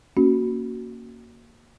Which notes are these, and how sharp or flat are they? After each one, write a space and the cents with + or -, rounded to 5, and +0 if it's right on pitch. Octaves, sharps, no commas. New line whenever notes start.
A#3 +5 C#4 +0 F#4 +0